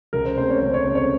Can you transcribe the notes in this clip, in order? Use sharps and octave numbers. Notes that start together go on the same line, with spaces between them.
C#2 A#4
C5
C#3 A3 C4 C5
C#5
C#2 C5
C#5
C#3 A3 C4 C5
C#5